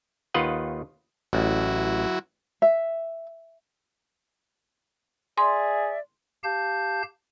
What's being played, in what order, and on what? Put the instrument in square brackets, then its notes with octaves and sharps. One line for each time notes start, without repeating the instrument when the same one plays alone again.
[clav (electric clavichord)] D#2 D#3 F4 B4 D#5 F#5
[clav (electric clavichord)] A1 [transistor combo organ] F#3 E4 F#4
[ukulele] E5
[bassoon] G#4 [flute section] D5 E5 [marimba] C6
[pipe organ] G4 F5 A5 G6